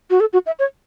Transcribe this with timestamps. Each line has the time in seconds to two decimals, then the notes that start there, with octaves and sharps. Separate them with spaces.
0.10 F#4
0.20 A4
0.33 F#4
0.46 E5
0.59 C#5